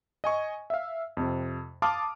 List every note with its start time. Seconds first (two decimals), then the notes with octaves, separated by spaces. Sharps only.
0.24 D#5 G#5 C#6
0.70 E5 F5
1.17 F2 C3
1.82 F5 A5 C6 D6 D#6 F6